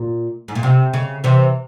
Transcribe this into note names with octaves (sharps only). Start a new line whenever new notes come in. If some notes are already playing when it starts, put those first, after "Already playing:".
Already playing: A#2
G#2
A#2
C3
C#3
C3 E3